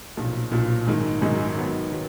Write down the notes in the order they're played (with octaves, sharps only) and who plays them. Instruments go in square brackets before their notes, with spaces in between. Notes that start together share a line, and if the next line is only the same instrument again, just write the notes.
[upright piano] B1 A#2 F3
B1 A#2 F3
G#1 F#2 D#3 G#3 D#4
G#1 F#2 D#3 G#3 D#4
D#3 F#3 B3
D#3 F#3